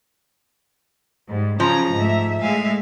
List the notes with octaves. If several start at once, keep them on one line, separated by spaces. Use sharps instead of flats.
G#2 G3
C#3 F3 F#3 A#5
G#2 A3 E5
A2 G#3 E5 F5 G#5